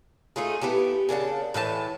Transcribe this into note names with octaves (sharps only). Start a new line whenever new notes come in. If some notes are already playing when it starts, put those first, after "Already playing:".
A3 D#4 F4 G#4
B3 E4 G4 A4
C#3 A#3 D4 F#5
A2 E3 E4 A5